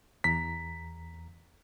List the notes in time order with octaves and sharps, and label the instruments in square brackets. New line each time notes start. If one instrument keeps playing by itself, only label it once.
[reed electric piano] E2 A#5 [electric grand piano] B6